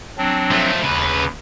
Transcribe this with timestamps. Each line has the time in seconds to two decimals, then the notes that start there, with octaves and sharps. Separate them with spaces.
0.18 F#3 C4 D4
0.51 F3 A3
0.82 D#2 C#3 B4